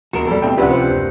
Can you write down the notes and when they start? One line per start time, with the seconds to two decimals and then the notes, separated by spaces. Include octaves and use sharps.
0.13 E1 F#3 F#4 A#4 E7
0.27 F2 A2 G3 A4
0.42 G2 B2 A3 C4 G5
0.58 C#2 C3 F3 D4 G4 B4 F#5
0.71 C5
0.90 F#1